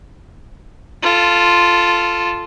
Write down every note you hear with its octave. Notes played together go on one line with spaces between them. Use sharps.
F4 A4